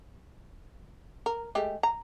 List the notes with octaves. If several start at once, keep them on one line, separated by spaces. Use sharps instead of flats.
A#4
G#3 A3 G4
A#5